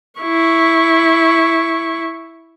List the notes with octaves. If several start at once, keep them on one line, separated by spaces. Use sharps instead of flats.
E4 C#6